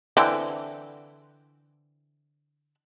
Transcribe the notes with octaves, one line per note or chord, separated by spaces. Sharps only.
D3 E3 C4